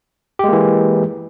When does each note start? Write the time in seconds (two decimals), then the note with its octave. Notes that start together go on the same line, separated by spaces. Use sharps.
0.39 G4
0.44 G#3
0.48 A#3
0.53 E3